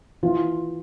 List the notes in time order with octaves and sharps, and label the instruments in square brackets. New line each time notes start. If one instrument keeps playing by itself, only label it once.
[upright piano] E3 [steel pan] F4